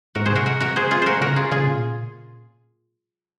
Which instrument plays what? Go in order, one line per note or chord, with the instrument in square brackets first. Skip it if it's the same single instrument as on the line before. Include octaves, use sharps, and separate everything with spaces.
[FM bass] G#2 [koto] F#4 A#4
[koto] G#4 C5
[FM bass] C3 [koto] F#4 A#4
[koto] F#4 A#4
F#4 A#4
[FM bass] C#3 [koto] G#4 C5
[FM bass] D#3 [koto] F4 G#4
[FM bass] C3 [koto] F#4 A#4 C5
[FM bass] C#3 [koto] F#4 A#4
[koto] F4 G#4
[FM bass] C#3 [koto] F4 G#4
[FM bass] A#2